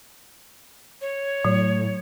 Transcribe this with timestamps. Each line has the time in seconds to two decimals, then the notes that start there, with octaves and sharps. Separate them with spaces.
1.01 C#5
1.45 A2 F#3